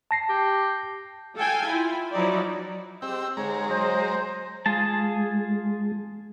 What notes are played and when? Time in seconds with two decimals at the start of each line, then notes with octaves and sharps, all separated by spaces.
0.11 A5 A#6 C7
0.29 G4
1.37 A4 F5 G5 G#5
1.67 E4 F4
2.12 F3 F#3 D#4 E4 D5
3.02 G#3 C4 G4 G5 E6
3.37 G#2 D3 G#3 C#5 A#5
3.68 F#3 C5 D#5
4.66 G#3 F4 G#4 A5